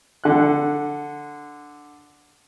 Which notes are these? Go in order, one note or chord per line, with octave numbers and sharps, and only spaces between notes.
D3 F#6